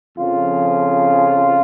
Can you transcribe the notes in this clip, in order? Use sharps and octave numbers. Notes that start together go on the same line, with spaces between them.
F2 C#3 F3 F4